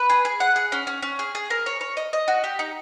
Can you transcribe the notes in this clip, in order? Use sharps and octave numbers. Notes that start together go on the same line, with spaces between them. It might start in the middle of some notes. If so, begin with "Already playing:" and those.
Already playing: B4
G#4
G#4
F#5
G#4
C#4
C#4
C#4
G#4
G#4
A#4
C#5
C#5
D#5
D#5
F#4
G4
D#4